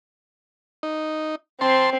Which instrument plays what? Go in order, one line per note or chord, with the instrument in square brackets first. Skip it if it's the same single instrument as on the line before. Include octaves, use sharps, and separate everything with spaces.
[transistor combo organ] D#4
[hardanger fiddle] C4 [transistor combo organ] C5 A5 C6